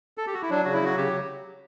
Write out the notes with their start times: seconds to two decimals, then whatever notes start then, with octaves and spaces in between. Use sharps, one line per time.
0.18 A4
0.27 G4
0.34 F#4
0.42 E4
0.50 F#3 D4
0.65 C#3 F#4
0.73 E4
0.82 F#3 F#4
0.97 C#3 G4